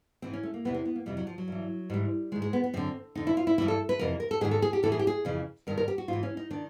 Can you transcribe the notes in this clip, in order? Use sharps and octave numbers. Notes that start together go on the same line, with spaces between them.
G#2 E3 C4
C#4
A3
A#3
E2 C3 E3 B3
C4
B3
A#3
F2 C3 E3 G3
F#3
F3
F#3
G2 E3
G#2 E3 G3
G#2 D#3 G#3
G#3
B3
B3
F#2 D3 C4
F2 D3 D#4
E4
F4
E4
G2 E3 E4
A4
B4
F2 C3 E3 A#4
A#4
A4
G#2 D#3 G#4
A4
G#4
G4
A2 E3 A4
G#4
G4
G#4
F2 C#3 E3
G2 D#3 A#4
A#4
G4
F#4
G#2 E3 F4
C#4
D#4
D#3 D4